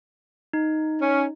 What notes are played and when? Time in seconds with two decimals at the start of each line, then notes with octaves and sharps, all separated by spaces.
0.53 D#4
1.01 C#4